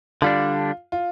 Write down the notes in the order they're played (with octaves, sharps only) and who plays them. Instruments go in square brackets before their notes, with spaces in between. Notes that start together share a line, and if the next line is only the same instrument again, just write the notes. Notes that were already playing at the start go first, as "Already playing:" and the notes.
[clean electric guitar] D3 G3 D4 [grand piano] F4
[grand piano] F4